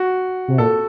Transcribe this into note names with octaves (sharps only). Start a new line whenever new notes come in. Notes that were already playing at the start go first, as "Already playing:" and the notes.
Already playing: F#4
C3
A#2 A4